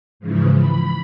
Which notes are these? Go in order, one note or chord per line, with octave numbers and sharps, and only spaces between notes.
G#2 C#3 E3 F3
B5